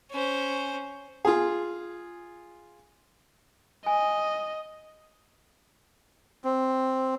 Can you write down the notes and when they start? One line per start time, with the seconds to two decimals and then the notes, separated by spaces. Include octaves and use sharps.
0.11 C#4 C5
1.25 F4 G#4
3.86 D#5 G#5
6.44 C4